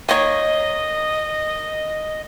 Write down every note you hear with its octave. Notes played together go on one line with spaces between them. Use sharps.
D#3 A#3 C#5 D#5